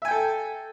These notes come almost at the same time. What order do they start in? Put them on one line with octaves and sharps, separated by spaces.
E5 G#5 G5 A4